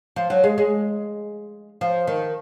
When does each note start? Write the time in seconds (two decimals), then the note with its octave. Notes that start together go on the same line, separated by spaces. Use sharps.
0.16 F3
0.30 F#3
0.44 G#3
0.58 G#3
1.81 F3
2.07 D#3